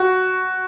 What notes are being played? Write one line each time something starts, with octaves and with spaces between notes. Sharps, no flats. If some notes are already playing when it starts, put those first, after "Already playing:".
Already playing: F#4